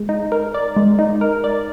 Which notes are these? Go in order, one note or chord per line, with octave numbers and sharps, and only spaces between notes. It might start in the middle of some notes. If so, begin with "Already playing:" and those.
Already playing: G#3
D#4
A#4
D5
G#3
D#4
A#4
D5